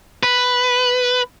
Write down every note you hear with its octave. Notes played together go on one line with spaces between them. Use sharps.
B4